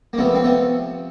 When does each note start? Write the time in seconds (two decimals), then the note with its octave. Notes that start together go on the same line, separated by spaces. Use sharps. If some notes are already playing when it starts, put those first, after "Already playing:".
0.13 A#3
0.18 C3 F3 A3 B3
0.35 C4
0.44 A3 B3